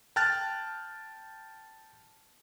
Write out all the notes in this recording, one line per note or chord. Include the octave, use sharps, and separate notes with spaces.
G5 A5 F6 F#6 A6